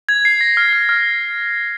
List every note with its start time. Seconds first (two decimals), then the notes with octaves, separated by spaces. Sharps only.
0.09 G#6
0.25 C7
0.41 A#6
0.57 F6
0.73 F6
0.89 F6